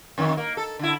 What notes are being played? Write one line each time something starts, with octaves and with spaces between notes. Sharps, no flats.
F2 D#3
A#3
A4
D3 E4